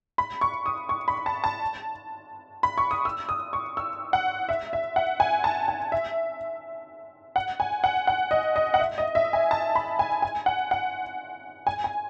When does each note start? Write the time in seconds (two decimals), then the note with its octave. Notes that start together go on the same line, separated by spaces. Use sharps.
0.18 B5
0.41 C#6
0.66 D#6
0.89 C#6
1.08 B5
1.26 A5
1.44 A5
2.63 B5
2.78 C#6
2.91 D#6
3.05 E6
3.29 D#6
3.53 C#6
3.77 E6
4.13 F#5
4.49 E5
4.73 E5
4.96 F#5
5.20 G#5
5.44 A5
5.68 G#5
5.92 E5
7.36 F#5
7.60 G#5
7.84 F#5
8.07 F#5
8.31 D#5
8.56 D#5
8.74 F#5
8.80 E5
8.98 D#5
9.15 E5
9.33 G#5
9.51 A5
9.75 B5
9.99 G#5
10.22 G#5
10.46 F#5
10.71 F#5
11.67 G#5
11.84 G#5